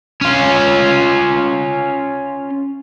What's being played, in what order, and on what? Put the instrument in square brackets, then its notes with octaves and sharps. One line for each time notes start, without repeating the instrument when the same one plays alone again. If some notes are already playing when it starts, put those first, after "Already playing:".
[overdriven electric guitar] C#4 F4